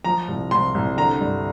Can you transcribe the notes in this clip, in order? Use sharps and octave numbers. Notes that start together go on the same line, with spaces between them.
F3 A#5
C2
C2 C6
C2
D3 A#5
G2